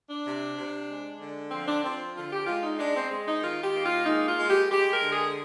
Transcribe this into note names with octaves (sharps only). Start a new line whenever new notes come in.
D4
C3
C3
G#3
D3
F3 C4
D4
F3 C4
D3 F4
G4
G#3 F4
D#4
G#3 D4
C4
G#3
D#4
D#3 F4
G4
A#3
F4
G#3 D#4
F4
G#3
G4
G#3 G4
A#4
D3
G#4